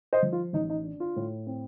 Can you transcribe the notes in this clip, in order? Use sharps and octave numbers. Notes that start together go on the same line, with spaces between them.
C5 D#5
F3
F4
A1 D#4
D#4
D4
F4
A2
C4